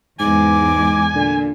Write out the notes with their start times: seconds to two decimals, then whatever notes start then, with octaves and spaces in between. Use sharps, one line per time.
0.20 E2 G#2 G#3 G#5 D6
1.16 A#2 D3